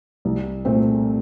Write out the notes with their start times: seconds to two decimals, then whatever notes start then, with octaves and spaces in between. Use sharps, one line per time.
0.25 C2
0.65 A#2 A3 C4